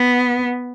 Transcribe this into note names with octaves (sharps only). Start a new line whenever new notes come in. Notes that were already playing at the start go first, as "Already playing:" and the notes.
Already playing: B3